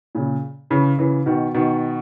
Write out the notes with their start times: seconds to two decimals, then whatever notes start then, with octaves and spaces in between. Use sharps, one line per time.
0.15 A#2 C#3
0.70 C#3 E3
0.99 C#3 E3
1.26 B2 D#3
1.54 B2 D#3